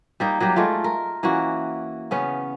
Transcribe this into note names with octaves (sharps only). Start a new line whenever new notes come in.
G3 A#3 D#4
F#3 G3 A#3 G4
G#3 A3 F4
A#4
E3 A#3 C#4 F#4
C#3 B3 C#4